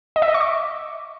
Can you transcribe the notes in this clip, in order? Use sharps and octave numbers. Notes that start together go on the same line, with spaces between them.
D#5
E5
D#5
C#6
D6